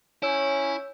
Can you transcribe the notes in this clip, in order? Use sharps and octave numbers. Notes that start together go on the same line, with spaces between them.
C#4 E4 C#5 E6 G6